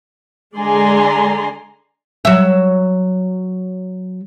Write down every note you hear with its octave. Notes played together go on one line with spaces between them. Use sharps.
D3 G#3 D5 G#5 A#5 C6
F#3 E5